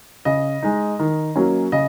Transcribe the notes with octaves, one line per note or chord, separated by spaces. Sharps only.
C#3 D#5
G#3 D#4
D#3
F#3 A#3 C#4
C#3 D#5